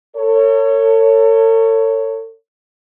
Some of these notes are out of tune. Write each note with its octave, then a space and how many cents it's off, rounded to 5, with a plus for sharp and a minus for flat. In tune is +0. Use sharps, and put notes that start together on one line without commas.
A4 +40 C#5 +0